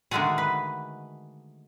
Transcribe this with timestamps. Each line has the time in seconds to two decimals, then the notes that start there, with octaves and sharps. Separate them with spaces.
0.11 D3 D#3 G#3 A3 F#4 G#4
0.38 B4